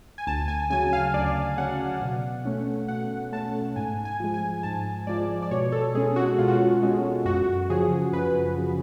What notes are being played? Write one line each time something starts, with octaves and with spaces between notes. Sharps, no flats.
G#5
D2 A5
G#5
C#3 F#3 G#5
F5
D2 D5
C#3 F#3 F#5
B2
A3 C#4
B2 F#5
A3 C#4 A5
G#2 G#5
G#5
F3 G#3
G#5
G#2 A5
F3 G#3 D5
D5
B2 C#5
A4
G#3 C#4 G#4
F#4
B2 F4
F#4
F4
G#3 C#4
F#2 F#4
C#3 F3 G#4
F#2 B4
C#3 F3